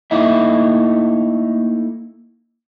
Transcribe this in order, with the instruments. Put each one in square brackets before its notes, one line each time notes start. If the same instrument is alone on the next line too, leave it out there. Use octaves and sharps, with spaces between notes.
[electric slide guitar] A3 A#3 D#4 E4 E5